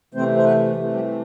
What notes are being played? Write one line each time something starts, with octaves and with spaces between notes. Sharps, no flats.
C3 E3 A3 C4 C5
C5
B3 B4
C3 E3 A3
G3 G4